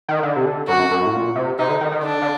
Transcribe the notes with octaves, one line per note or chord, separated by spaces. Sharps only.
D#3
D3
C3
D3
F#2 F#4
F#2
A2
A#2
C3
C3 D#4
D3
D#3
D#3
D3 D4
D3